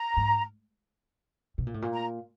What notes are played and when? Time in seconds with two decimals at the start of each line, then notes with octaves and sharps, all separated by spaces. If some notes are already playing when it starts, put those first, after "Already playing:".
Already playing: A#5
0.17 G#2
1.58 B2
1.67 A#2
1.74 A2
1.82 A#2
1.93 A#5